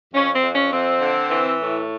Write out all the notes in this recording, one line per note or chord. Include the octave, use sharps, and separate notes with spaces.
F2 C#4
C4
F2
C#4
F2 C4
D3
E3
A2